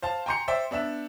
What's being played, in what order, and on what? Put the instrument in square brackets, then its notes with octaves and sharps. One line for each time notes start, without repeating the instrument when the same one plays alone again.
[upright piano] C5 F5 A5
G5 G#5 A#5 C6 G6 C#7
C5 D5 E5 G5
B3 D4 E5 E7